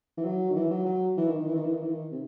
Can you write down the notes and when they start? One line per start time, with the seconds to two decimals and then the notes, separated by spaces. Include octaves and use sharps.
0.17 E3
0.25 F#3
0.50 D#3
0.56 E3
0.71 F#3
0.86 F#3
1.17 E3
1.27 D#3
1.38 D#3
1.47 E3
1.55 D#3
1.65 E3
1.73 D#3
1.82 E3
1.91 D#3
2.11 C3